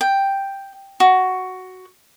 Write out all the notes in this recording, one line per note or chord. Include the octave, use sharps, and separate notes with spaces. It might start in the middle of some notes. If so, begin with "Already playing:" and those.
G5
F#4